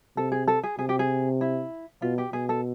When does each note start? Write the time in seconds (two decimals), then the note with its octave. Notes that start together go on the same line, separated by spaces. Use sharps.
0.17 C3 A4
0.32 G#4
0.48 A4
0.64 G#4
0.79 C3 G#4
0.89 G4
0.99 G#4
1.41 E4
2.02 B2 F4
2.18 G4
2.33 B2 G#4
2.49 A4